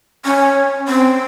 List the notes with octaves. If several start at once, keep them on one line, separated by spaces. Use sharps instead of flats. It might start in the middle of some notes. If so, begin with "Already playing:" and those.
C#4
C4